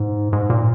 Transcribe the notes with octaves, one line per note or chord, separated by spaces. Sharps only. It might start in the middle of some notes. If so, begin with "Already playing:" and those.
Already playing: G#2
G#2
A#2